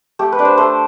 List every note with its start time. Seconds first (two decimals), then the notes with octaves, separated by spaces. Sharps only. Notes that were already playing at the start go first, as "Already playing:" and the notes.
0.19 A3 G4
0.32 B4
0.39 D4 D5
0.45 C5
0.58 A3 C5